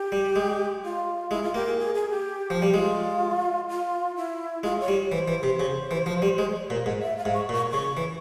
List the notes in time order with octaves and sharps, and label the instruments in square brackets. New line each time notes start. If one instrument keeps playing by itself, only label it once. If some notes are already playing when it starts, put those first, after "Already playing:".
Already playing: [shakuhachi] G4
[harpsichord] G3
G#3
[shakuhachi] F4
[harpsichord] G#3 [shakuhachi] E4
[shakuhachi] F4
[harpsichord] A#3 [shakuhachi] G4
[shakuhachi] G#4
G#4
G#4
G4
[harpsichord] F3
G3
[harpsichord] G#3 [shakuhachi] F4
[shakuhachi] F4
E4
[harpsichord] G#3 [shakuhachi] F4
[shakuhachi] C#5
[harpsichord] G3
[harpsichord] E3 [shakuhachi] C5
[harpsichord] E3
C3
C#3
E3
F3
G3
G#3
A#2
G#2
[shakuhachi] E5
F5
[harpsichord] G#2
[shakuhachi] C#6
[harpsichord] A#2
[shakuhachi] C#6
[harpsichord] C#3 [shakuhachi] C#6
[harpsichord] E3